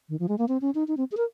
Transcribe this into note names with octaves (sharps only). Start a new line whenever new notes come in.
D#3
F3
G#3
A#3
C4
C#4
D#4
D#4
C4
G#4
A#4